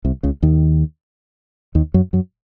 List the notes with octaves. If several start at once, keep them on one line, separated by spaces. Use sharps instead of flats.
C2 C3
C#2 C#3
D#2 D#3
D#2 D#3
F#2 F#3
F#2 F#3